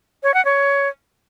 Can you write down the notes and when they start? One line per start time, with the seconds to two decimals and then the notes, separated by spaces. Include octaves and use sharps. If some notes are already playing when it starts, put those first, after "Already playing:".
0.23 C#5
0.34 F#5
0.45 C#5